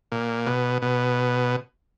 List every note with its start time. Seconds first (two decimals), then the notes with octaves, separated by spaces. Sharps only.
0.12 A#2
0.46 B2
0.82 B2